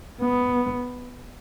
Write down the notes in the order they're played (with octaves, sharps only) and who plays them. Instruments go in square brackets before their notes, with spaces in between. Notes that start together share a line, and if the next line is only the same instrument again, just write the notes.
[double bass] B3